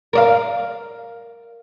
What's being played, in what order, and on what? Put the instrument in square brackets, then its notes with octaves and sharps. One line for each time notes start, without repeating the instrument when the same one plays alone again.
[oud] A#4 D5 F5